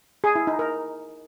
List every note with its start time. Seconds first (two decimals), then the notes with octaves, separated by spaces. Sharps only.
0.24 G#4
0.35 E4
0.47 D#4
0.59 A#4